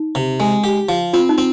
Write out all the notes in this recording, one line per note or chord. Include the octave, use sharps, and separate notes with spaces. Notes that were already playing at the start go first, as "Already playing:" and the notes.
Already playing: D#4
C3
G#3
G4
F3
C4 F4
D#4
C4